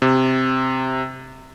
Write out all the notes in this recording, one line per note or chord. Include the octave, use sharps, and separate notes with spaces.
C3